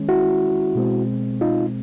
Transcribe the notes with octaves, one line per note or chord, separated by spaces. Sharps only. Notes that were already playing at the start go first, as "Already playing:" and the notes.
Already playing: D#3 G#3 C#4
E4 F#4
B2 G#3 C4
D#4 F4